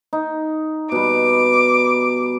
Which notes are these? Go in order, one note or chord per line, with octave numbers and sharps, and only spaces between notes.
D#4
B2 G3 D6